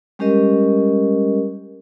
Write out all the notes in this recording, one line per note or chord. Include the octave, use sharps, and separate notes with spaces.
G3 G#3 C#4 G4 A#4 D#5